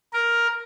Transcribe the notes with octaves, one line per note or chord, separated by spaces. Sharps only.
A#4